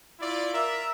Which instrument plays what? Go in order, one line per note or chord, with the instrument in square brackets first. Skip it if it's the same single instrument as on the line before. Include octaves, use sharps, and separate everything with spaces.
[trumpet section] E4 F4 D5
A#4 E5